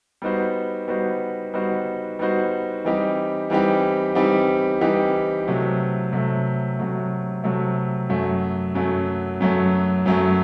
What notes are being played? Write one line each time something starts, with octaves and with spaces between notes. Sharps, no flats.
G3 B3 D#4 F#4 C5
G3 B3 D#4 F#4 C5
G3 B3 D#4 F#4 C5
G3 B3 D#4 F#4 C5
E3 G3 C4 D#4 G4
E3 G3 C4 D#4 G4
E3 G3 C4 D#4 G4
E3 G3 C4 D#4 G4
C3 F#3 A3
C3 F#3 A3
C3 F#3 A3
C3 F#3 A3
F#2 F#3 A3
F#2 F#3 A3
F#2 F#3 A3
F#2 F#3 A3